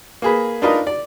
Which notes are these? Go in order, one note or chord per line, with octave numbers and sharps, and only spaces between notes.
A#3 G#4 B4
D4 D#4 F4 A#4 B4 D#5
D5